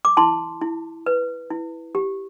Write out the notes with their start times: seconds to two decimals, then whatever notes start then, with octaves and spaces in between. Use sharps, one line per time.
0.05 D6
0.17 E4 A5 C6
0.61 E4
1.06 B4
1.50 E4
1.95 G4